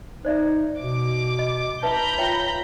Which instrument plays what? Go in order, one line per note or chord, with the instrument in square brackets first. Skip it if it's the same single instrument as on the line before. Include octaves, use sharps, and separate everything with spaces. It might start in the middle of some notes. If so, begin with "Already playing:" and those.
[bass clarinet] D#4 [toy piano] C5 D5 E5
[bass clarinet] B2 [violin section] D6
[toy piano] D#5
[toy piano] D#4 B4 E5 [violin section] A#5 B5 G6
[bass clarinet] F4 [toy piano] C#5 E5 G5